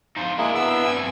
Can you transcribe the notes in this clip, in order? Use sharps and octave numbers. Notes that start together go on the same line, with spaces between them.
D#4 F4 C5
G#3 A#3 D4 E4
B3 E6
G2 C4 G#5